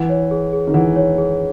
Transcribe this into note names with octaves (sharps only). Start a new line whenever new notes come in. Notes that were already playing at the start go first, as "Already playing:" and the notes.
Already playing: E3 F#5
C#5
G#4
G#4
D#3
E3 F#5
C#5
G#4